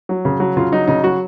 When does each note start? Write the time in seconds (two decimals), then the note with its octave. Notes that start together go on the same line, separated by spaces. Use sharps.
0.09 F#3
0.25 C#3
0.40 F#3
0.57 C#3 F4
0.72 F#3 D#4
0.88 C#3 D#4
1.04 F#3 F#4